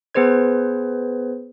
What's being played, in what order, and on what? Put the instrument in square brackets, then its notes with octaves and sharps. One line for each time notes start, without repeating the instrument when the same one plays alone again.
[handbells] B3 G#4 B4 C5 G#6